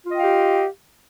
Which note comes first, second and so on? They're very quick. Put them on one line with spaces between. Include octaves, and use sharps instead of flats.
F4 D#5 G5 F5 G4